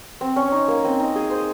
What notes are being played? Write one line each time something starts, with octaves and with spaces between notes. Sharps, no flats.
C4
C#4
D#4
A#3
C4
D#4
G#4
C5